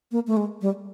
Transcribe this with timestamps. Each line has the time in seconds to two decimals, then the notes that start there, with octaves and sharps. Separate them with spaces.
0.12 A#3
0.27 A3
0.37 G#3
0.62 G3